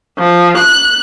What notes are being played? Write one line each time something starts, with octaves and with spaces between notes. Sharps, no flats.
F3
F#6